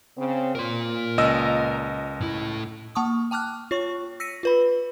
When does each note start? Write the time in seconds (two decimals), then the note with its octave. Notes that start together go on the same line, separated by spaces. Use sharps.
0.16 C#3 C4
0.55 A#2 A#4 C6
1.18 C#2 D#5 E6
2.21 A2 E4
2.95 A#3 A5 C#6 D#6
3.31 G5 A5 D6 F6 F#6
3.71 F4 C#5 C#6
4.20 E6 A#6 B6 C#7 D#7
4.43 F4 B4 B5